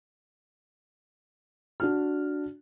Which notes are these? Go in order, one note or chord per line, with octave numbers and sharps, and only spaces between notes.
D4 F#4 F6